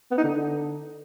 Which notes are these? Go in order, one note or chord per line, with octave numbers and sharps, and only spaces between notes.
B3
D#4
D3